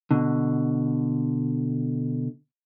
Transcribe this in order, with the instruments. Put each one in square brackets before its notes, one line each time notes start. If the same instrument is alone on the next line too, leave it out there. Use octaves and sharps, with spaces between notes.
[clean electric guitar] B2 D3